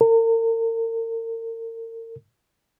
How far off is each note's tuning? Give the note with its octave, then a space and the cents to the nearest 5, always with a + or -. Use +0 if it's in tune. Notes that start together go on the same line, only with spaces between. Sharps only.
A#4 -40